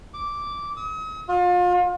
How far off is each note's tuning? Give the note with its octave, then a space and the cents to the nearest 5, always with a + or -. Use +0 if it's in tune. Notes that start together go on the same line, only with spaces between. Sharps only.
D6 -10
D#6 +40
F4 +35